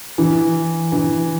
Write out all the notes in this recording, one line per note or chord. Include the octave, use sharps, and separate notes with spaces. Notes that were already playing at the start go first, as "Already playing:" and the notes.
E3
E3